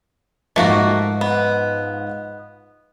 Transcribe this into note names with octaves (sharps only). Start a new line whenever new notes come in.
G#2 F3 A3 A#3 F#4
B3